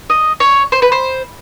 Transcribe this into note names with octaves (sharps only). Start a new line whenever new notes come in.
D#5
C#5
C5
B4
C5